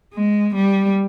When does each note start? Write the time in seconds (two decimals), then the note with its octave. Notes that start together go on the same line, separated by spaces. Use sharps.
0.14 G#3
0.55 G3